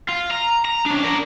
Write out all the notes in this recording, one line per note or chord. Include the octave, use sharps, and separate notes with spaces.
F4
A#5
A#5
C#4 D4
D4 A#4